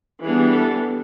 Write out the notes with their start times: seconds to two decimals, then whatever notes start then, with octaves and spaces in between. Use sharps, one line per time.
0.23 E3 G3 B3 D4 G#4
0.54 A4